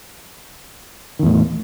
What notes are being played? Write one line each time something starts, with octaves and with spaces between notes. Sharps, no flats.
E2 A2 D#3